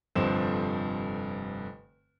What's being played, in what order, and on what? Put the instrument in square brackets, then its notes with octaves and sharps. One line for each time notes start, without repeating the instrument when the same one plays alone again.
[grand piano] F1 G2 D3 F3 C4 E7